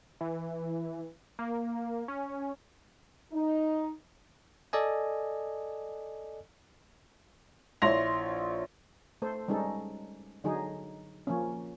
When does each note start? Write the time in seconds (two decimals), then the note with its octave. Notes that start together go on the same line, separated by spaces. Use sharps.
0.21 E3
1.39 A#3
2.08 C#4
3.32 D#4
4.73 A4 D5 D#5 G#5
7.82 A#1 E4 C#5 C6 A#6 F7
9.22 A3 A4 C5
9.48 G3 G#3 C#4 D#4 A4
10.44 D3 F#3 D#4 G#4
11.27 F3 A#3 C#4